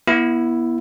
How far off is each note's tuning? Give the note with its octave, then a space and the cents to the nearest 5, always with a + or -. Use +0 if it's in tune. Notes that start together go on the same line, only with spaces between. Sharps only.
B3 -25 E4 +5